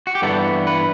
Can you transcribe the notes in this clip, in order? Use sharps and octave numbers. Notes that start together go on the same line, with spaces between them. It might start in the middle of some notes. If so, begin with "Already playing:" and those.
F#4
G4
G2 E3 B3 A4
B4